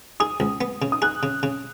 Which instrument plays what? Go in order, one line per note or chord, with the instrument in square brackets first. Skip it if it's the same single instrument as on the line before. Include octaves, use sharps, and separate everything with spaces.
[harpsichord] G#4 [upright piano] D#6
[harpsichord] C#2
B3
C#3
[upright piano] D#6
[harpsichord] G#4 [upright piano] F#6
[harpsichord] C#3
C#3